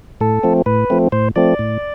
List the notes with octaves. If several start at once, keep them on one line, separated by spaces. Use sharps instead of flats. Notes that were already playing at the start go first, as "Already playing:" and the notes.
A2 A4
F3 A3 C4
A2 B4
F3 A3 C4
A2 C5
F3 A3 C4 D5
A2